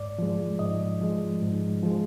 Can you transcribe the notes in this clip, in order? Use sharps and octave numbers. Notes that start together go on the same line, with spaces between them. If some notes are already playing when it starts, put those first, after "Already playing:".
Already playing: G#2 D5
F3 G#3
G#2 D#5
F3 G#3
G#2
F3 G#3